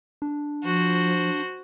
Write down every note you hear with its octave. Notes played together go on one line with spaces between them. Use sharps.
D4
F3 F#4 C5